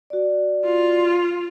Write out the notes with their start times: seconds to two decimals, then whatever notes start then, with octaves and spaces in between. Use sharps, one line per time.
0.10 F#4 D5
0.64 F4